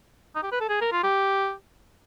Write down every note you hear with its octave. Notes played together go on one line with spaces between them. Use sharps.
D#4
G4
B4
A4
G#4
A#4
F4
G4